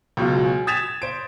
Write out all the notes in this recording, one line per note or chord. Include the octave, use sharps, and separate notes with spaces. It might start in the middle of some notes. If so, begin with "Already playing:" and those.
C#2 B2 F#3 F4
G#5
D#6 G#6 A6 B6 E7 F7
C5 D7